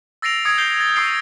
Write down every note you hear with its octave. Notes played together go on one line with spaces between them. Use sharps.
E6 A6 A#6 C7 D7 F7
D#6 G#6 C#7 D7
G6 C7 D7 F7 G7
A6
C#6 D#6 E6 C7 D7